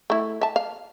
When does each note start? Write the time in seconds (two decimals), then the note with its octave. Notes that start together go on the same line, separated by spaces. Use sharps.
0.10 A3 E4
0.41 E5 A5
0.56 F5